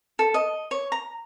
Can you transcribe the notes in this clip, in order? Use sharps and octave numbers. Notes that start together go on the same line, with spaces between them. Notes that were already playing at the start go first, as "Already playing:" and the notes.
A4
D#5
C#5
A#5